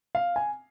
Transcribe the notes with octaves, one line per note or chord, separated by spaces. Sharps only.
F5
G#5